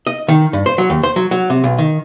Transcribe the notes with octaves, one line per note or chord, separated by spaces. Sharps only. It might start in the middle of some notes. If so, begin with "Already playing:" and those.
D#5
D#3
G2
C5
F#3
D#2
C5
F#3
F#3
C3
B1
D#3